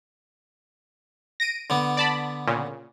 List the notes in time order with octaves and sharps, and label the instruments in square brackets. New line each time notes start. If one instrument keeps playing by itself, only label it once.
[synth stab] A#6 D7 D#7
[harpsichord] D3 B3
[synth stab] D5 A5 B5
A#2 C#3